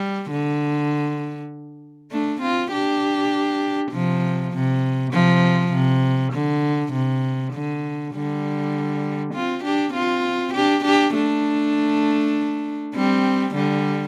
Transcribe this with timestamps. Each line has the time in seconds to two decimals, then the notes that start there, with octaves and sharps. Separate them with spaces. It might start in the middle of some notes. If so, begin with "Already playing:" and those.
Already playing: G3
0.31 D3
2.11 A3 D4
2.41 C4 F4
2.72 D4 G4
3.92 C3 F3
4.53 C3
5.13 C3 F3
5.73 C3
6.33 D3
6.93 C3
7.53 D3
8.14 D3 G3
9.34 C4 F4
9.64 D4 G4
9.94 C4 F4
10.54 D4 G4
10.85 D4 G4
11.15 A3 D4
12.96 G3 C4
13.55 D3 G3